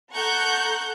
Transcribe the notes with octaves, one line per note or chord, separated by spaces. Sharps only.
A4 F#5 A#5 C#6 F#6 G6